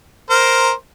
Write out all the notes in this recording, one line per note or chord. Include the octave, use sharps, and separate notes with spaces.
A#4 C5